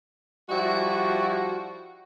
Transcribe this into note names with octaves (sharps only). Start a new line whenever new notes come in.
F3 G3 E4 F#4